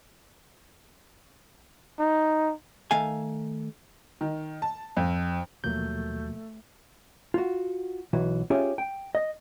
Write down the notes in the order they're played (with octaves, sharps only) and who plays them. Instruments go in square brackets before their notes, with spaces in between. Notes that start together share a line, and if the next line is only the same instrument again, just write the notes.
[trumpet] D#4
[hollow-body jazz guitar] D#3 A3 F5 G#5
[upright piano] D#3
A5
F2
[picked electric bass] D#2 F#3 [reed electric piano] B2 F3 A#3 [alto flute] A3 [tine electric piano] G6
[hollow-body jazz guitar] F4 F#4
B1 E3 F#4
C#4 F4 G4 G#4 E5
G5
D#5